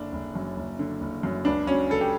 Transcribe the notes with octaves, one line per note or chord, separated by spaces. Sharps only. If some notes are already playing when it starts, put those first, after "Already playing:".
Already playing: F#1 D3 D4
F#1
F#2
F#1
D3
F#1
F#2
C#2 D4
F#3 C#4
C#2 A4
G4